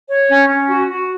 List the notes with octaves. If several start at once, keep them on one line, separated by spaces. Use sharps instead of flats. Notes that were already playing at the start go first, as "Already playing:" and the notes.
C#5
C#4
C#4
F#4
F#4